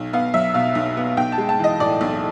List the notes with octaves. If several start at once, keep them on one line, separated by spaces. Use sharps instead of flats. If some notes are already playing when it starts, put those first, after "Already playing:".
Already playing: B1
B3 F5
F#3 E5
B2 F5
B1
B3
B1 G5
A5
G#3
A5
E3 D#5
A2 D5
B1